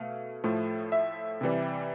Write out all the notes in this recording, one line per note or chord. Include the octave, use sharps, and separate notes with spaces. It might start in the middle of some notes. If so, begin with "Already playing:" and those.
Already playing: B2 A3 F5
A2 F3 A3
E5
C3 E3 G3